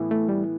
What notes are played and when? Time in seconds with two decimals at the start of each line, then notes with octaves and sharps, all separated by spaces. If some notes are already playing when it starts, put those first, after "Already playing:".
Already playing: A2 E3 B3 E4
0.11 A3
0.29 G3